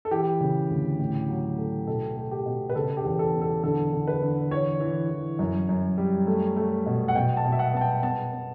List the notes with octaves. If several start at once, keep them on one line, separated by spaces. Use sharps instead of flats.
A4
E3 G4
C#3
D2
A2
F#3
A3
B2 A4
A3
G4
B2
B4
C#3 A4
G4
E2
A4
B3
A4
D3 A4
D3
B4
D3
E3 C#5
E3
E3
F#2
F#2
G3
A3
A3
B2
F#5
B2 G5
A5
B2
E5
F#5
B3 A5
G5
B3 A5
B3